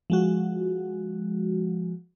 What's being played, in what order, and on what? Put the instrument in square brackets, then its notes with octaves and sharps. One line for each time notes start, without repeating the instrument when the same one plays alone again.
[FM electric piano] F3 G#3 F#4